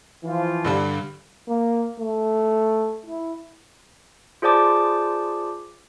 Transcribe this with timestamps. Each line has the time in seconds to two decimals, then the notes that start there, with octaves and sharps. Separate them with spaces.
0.24 E3 F3 F4
0.65 G2 D3 G3
1.49 A#3
2.00 A3
3.06 E4
4.42 F4 G#4 C5 D5 A5 D6